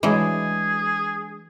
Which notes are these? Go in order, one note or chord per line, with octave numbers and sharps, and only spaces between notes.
E3 F#3 G#3 D4 G#4